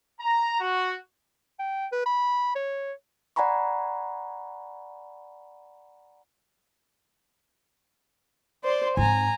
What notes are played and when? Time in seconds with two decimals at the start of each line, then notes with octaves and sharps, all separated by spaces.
0.20 A#5
0.60 F#4
1.59 G5
1.92 B4
2.06 B5
2.55 C#5
3.36 D5 F#5 G#5 A#5 B5 C#6
8.64 C5 D5 C6
8.97 G#2 C4 G#5 A#5